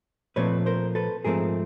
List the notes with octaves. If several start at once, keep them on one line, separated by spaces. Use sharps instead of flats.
A#2 F3 A3 C4 B4 C#5
A#4 C5
A4 B4
G#2 F3 A3 C4 G#4 A#4